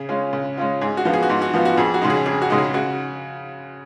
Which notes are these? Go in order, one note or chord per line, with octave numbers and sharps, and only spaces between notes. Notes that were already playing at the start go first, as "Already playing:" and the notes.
Already playing: C#3 G#4
G#3 C#4 F4
C#3
G#3 C#4 F4
G#2 G#4
F#4
F3 B3 F4
G#4
F#4
G#2
F#4
F3 B3 F4
F#4
F2 G#4
F#4
C#3 G#3 D#4
G#4
F2 G#4
F#4
C#3 G#3 D#4
G#4
C#3 F#4